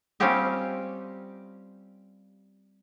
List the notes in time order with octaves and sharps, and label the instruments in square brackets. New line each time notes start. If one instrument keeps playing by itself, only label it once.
[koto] G3 C4 C#4 F4 G4 D#5